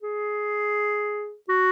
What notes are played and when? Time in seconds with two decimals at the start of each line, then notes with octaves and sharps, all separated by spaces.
0.02 G#4
1.49 F#4